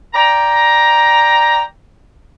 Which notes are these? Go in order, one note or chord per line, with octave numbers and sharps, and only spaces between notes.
D5 G5 A#5